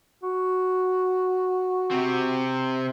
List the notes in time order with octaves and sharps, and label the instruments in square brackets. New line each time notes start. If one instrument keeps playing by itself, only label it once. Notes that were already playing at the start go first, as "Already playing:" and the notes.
[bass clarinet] F#4
[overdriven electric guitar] C3 C4